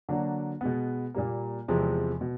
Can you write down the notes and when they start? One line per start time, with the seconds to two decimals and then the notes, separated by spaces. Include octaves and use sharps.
0.09 D3 F#3 A#3 D4 F#4
0.61 B2 G#3 B3
1.14 A#2 G3 A#3
1.68 E2 C3 F3 G#3 C4
2.21 B2